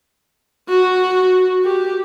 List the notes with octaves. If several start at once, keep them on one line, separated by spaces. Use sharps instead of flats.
F#4
G4